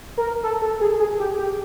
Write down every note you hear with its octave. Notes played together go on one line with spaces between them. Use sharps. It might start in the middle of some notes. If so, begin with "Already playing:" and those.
A#4
A4
A4
G#4
G#4
G4
G4